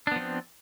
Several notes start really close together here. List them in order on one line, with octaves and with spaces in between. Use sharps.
D4 B3 F3 C4